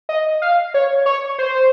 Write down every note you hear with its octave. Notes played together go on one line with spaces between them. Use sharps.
D#5
F5
C#5
C#5
C5